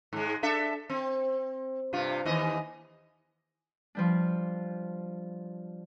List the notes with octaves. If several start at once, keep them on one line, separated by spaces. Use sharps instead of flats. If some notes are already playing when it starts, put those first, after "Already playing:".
G#2 G#3
D4 A4 E5
C4
G2 C3 F4
D#2 E3 D#5
F3 G3 D4